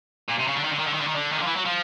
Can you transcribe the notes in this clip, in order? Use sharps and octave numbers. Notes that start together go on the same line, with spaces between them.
A#2
C3
C#3
D3
D#3
D3
D#3
D3
D#3
D3
D#3
D3
D#3
D3
F3
E3
F#3
F3